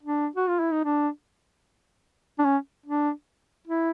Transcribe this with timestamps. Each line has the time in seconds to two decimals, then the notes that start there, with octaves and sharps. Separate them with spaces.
0.03 D4
0.36 F#4
0.48 F4
0.60 E4
0.71 D#4
0.84 D4
2.39 D4
2.45 C#4
2.86 D4
3.67 E4